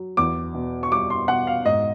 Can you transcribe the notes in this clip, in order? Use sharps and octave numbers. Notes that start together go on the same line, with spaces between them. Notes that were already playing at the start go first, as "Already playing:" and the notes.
Already playing: F#3
E2 D6
B2
C#6
G3 D6
C6
B2 F#5
F5
G#2 D#5